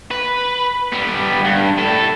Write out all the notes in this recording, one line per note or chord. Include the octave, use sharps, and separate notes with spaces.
B4
G3 B3
G2
A2 A4